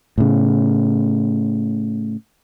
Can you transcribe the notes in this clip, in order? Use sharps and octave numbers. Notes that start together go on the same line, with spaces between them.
A2 C#3